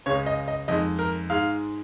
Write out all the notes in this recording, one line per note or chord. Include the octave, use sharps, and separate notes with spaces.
C#2 C#3 G#3 C#5
D#5
D#5
F2 D#3 G#3 D#5
A#4
G#2 G#3 F5